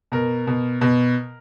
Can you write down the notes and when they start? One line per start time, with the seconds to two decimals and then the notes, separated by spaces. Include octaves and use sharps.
0.12 B2 A#4
0.47 B2
0.81 B2